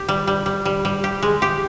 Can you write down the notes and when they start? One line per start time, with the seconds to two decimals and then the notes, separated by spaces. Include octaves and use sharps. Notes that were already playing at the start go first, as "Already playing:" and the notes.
Already playing: G4
0.09 G3
0.27 G3
0.46 G3
0.65 G3
0.85 G3
1.04 G4
1.22 G#3
1.42 G4